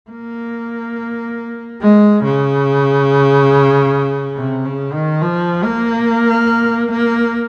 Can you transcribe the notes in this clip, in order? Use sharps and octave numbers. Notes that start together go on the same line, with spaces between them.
A#3
G#3
C#3
C3
C#3
D#3
F3
A#3
A#3